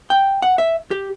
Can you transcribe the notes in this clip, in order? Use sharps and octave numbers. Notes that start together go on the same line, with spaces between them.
G5
F#5
E5
G4